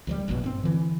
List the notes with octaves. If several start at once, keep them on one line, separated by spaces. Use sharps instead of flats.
D2 F3 G3
F1 A#1 F#2 B2
G2 C4
D3 E3